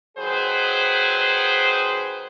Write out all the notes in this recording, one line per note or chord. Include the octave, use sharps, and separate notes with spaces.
D#3 F#3 G#4 B4 C5